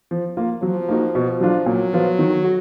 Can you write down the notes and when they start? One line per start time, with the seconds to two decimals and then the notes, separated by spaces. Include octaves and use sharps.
0.11 F3
0.37 A#3 F4
0.63 F3 F#3
0.88 A#3 D#4 F#4
1.15 B2
1.41 F#3 D4 F4
1.66 A#2 F#3
1.93 F3 B3 F4
2.19 D#3
2.44 F#4